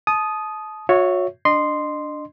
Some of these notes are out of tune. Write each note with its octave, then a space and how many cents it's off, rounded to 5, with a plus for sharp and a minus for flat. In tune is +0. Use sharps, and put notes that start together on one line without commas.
A5 -30 D#6 +0
F#4 -40 C#5 +0 E5 +0
D4 +0 D#5 -30 C6 -5